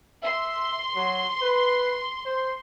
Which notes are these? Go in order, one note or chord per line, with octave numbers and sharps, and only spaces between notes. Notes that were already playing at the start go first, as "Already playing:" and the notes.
E5 C6
F#3
B4
C5